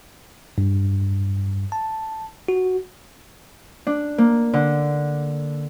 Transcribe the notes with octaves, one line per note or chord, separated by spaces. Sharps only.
G2
A5
F#4
D4
A#3
D3